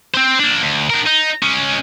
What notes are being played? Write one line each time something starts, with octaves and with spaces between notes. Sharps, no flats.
C4 C5
A#3 D4
D2
D4 A#4
D#4
G#3 C#4